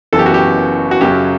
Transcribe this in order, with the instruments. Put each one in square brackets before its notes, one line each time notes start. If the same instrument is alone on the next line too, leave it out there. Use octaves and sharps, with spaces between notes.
[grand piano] F#1 F#2 E3 B3 [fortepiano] A4
[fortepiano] G4
F#4
G4
F#4
[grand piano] F#2 C#3 F#3 [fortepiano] G4